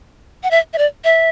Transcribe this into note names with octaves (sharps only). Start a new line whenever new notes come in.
F#5
E5
E5
D5
E5